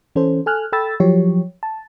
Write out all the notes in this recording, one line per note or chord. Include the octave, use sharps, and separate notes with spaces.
E3 C#4 A4 C5
A4 G#5 F6 F#6
A4 G5 B5 E6 A6
F3 F#3 G4 C#5
A5